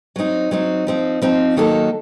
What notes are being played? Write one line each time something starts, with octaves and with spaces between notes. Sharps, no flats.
F#3 C4 D#4
F#3 C4 D#4
F3 C4 D#4
F3 C4 D#4
D#3 F#3 A#3 D#4 A4